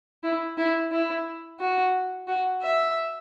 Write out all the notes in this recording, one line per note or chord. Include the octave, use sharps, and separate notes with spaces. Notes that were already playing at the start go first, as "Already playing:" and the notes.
E4
E4
E4
F#4
F#4
E5